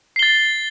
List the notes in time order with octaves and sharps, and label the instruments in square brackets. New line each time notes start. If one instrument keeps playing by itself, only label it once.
[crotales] C7
G7
A6